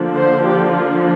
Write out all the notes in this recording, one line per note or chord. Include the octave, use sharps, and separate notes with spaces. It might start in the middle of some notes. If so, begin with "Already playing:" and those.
Already playing: D3 F3 A#3 D4
C5
G4
F4